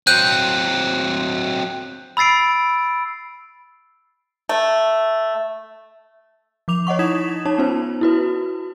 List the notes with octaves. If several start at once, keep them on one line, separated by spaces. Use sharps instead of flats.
F#3 C4 F#6 G6 D#7
B5 E6 A6 C7 D7
A3
F3 D6 F7
C#5 D#5 F#5 C#6
D#4 E4 D#6 G#6 B6 E7
D#4 C#5 A5
B3 C#4 F4 C5
E4 F#4 B4